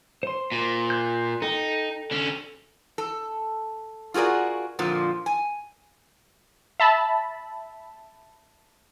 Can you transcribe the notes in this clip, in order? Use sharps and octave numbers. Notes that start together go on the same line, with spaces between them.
C5 C6
A#2
C6 F#6 G6
D#4 A4 G5
D3 C#4
A4
F4 F#4 G#4 A#4 D5
F2 A#2 D3 F3
G#5
E5 A5 B5